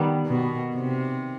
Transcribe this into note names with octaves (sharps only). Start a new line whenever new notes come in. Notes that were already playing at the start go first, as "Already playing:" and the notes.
Already playing: D#3 G3 B3
B2
C3